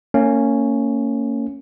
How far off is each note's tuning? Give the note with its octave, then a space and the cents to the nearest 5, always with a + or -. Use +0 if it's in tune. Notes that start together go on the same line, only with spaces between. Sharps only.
A#3 -30 C#4 +0